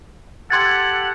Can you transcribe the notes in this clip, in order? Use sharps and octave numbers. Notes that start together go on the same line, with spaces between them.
G4 A4 F#5 C6 G#6 A6